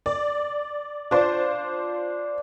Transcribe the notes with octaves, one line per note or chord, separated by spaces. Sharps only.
D5
D4 F4 C5 D6